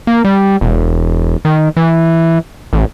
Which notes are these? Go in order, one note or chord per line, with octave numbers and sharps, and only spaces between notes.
A#3
G3
E1
D#3
E3
A1